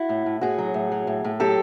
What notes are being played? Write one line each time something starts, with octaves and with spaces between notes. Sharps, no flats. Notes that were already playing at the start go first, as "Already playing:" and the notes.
Already playing: E4 F#4
A2
A2
A2 F#4 G#4
F#3
A2
F#3
A2
A2
F#3 G4 A4